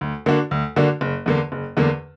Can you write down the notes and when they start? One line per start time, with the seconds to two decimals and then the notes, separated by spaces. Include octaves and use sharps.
0.01 D2
0.26 D3 A#3 D4 F#4
0.51 D2
0.76 D3 A#3 D4 F#4
1.01 F#1
1.26 E2 D3 A#3
1.52 F#1
1.77 E2 D3 A#3